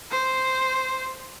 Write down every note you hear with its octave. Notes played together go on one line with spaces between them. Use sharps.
C5